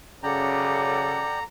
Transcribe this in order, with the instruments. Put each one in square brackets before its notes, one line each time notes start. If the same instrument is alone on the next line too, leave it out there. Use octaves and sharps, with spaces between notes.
[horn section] F#2 C#3 [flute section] A4 F#5 D6 [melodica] D5 G5 [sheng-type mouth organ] A#5